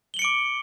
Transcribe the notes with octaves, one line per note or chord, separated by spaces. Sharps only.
D6 C#7 D7 F#7 G7